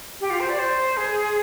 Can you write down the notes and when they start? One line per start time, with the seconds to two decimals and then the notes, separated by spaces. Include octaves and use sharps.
0.21 G4
0.30 F4
0.40 C5
0.49 D5
0.59 C5
0.97 G#4